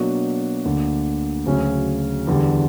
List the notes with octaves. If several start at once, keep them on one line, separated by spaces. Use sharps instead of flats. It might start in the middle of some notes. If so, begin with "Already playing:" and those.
Already playing: B2 F#3 A#3 D4 F#4
D2 D3 A#3
D2 C#3 F#3 C#4
E2 D3 G3